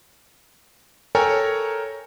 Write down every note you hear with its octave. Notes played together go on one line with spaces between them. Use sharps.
A4 A#4 C#5 G5 G#5 A#5